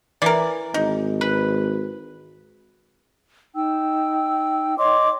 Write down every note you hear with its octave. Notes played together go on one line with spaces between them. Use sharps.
E3 A#4 D5
G#1 D#4
B4
D#4 G5 E6
C#5 D#5 C6 D6